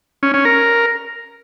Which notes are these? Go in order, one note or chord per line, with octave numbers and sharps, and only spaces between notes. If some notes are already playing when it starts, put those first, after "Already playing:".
C#4
C#4
A#4